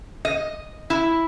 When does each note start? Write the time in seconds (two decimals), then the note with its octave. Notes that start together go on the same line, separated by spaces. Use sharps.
0.25 D#5
0.90 E4